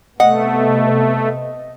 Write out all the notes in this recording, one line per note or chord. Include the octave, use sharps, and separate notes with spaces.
C3 A3 B3 D#5 F#5